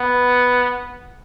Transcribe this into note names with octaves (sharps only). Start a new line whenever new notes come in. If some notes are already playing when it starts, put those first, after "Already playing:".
Already playing: B3